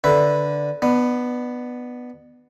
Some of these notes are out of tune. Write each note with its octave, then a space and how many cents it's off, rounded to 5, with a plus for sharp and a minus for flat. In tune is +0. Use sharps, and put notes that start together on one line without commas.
D3 -5 B4 +0 E5 +0
B3 +0 D4 +35